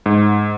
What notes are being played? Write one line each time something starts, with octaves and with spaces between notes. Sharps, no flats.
G#2